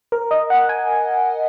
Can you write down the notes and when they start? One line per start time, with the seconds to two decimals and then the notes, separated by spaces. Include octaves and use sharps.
0.12 A#4
0.31 D#5
0.50 F#5
0.69 G#5